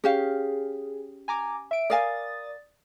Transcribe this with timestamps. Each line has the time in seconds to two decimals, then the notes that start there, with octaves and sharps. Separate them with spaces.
0.04 C#4 G4 G#4 F5
1.28 G#5 A#5 D6
1.71 E5 D7
1.90 A#4 D5 F5 G#5 D#6 A6